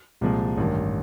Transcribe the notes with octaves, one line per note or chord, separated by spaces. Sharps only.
C2 A#2 F3 G#3
A1 G2 D#3